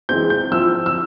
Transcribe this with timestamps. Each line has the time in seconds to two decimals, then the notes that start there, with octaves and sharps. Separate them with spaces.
0.09 E3 G#3 C4 G6
0.30 G6
0.51 F3 C4 E4 E6
0.86 E6